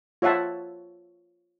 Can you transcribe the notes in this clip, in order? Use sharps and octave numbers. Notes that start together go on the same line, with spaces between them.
F4 C#5 E5 F#5 A5